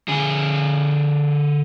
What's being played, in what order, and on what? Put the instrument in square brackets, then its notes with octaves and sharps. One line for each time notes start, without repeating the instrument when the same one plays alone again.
[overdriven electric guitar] D3 G#4